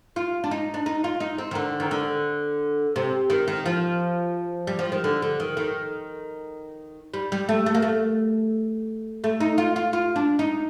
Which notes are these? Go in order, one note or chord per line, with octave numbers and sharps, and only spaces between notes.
F4
D4
D#4
D4
D#4
F4
D#4
C4
D#3
D3
D#3
D3
C3
D#3
D#3
F3
G3
F3
D#3
D3
D3
D#3
D#3
G3
G3
A3
A3
A#3
A3
A3
D#4
F4
F4
F4
D4
D#4